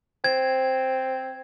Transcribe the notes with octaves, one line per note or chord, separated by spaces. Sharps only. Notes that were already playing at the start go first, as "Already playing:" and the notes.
C4 G#6